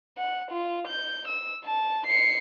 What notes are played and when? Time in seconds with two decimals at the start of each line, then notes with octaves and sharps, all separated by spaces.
0.18 F#5
0.51 F4
0.88 G6
1.28 E6
1.65 A5
2.07 C7 C#7